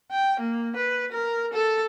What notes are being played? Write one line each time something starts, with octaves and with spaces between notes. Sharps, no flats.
G5
A#3
B4
A#4
A4